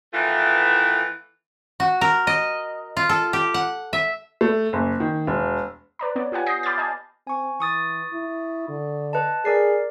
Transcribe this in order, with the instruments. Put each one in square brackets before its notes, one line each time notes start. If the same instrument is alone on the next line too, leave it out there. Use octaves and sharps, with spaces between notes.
[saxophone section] D#3 E3 A3 B3 E4 F4
[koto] F#4
A#4
D#5
F4
A4
G4
F#5
E5
[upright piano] A3
F#1
D#3
E1
[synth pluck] B4 D5 A#5
B3 C#5 D5
F4 G4 F#5 G#5
D#6 G6 A#6 C7
B5 D6 F6 G6 A6
D#5 G#5 A5
[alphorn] C4 [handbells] G#5 C#6
[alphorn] E3 [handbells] C#6 D#6 A6
[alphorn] E4
D3
[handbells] B4 D#5 A5
[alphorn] G#4 [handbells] A#4 D5 C7